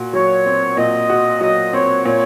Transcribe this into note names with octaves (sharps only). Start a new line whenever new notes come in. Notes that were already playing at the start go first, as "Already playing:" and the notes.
Already playing: A#2 F#4
F#3 C#5
C4
A#2 D#5
F#4
F#3 D#5
C4 C#5
A#2 C#5